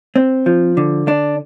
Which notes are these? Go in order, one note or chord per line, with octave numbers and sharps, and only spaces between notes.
C4
F3
D3
D4